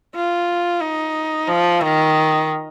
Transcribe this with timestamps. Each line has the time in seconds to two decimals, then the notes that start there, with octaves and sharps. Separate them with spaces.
0.16 F4
0.81 D#4
1.47 F3
1.81 D#3